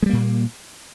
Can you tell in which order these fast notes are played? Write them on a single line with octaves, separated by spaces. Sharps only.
G#3 G3 A#3 A#2